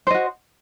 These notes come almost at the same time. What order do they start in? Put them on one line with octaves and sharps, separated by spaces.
C5 D#5 F#4